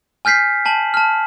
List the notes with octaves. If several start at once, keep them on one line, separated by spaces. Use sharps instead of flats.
G#5 F6 G6 B6 C7
G#5 A5 F#7
A5 F6